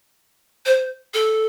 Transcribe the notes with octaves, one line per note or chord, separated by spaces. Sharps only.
C5
A4